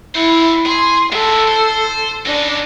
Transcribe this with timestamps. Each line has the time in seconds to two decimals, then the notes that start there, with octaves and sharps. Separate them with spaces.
0.15 E4 C5 F#5
0.66 G#4 C6
1.13 F#3 E4 A4
1.48 C5
2.26 C#3 D4 D#4